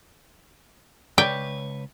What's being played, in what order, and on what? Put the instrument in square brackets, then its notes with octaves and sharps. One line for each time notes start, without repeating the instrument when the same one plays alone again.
[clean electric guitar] C#2 B4 C#5 [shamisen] D5 [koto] G5